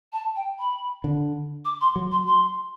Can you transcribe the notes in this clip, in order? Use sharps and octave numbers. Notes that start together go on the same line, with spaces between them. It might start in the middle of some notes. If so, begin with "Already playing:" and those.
A5
G5
B5
D3
D6
C6
F#3
C6
C6